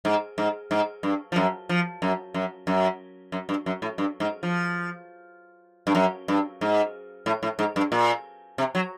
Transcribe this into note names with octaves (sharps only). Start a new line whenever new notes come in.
G#2
G#2
G#2
G2
F3
F#2
F3
F#2
F#2
F#2
F#2
G2
F#2
A2
G2
G#2
F3
G2
F#2
G2
G#2
A2
A2
G#2
G2
A#2
C3
F#3